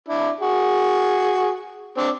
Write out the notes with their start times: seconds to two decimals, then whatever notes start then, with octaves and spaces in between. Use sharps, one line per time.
0.08 D4 E4
0.40 F#4 G#4
1.97 C4 D4